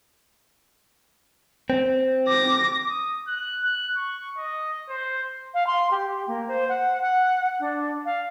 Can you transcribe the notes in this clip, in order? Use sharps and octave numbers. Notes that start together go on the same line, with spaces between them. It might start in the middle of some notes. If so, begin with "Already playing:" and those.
C4
D6 A#6
D#6
F#6
F#6
C#6
D#5
C5
F5
C6
G4
A#3
C5
F#5
F#5
D4
F5